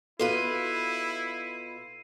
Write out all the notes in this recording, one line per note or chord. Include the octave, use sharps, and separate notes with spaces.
B2 E4 F4 A4 B4 C7 D#7